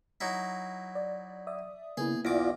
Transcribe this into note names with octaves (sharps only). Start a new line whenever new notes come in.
F#3 D#4 E4
D5
D5 E5 D#6
C#3 A#3 B3 E4 G#4
B1 E2 E4 F4 D5 D6 A#6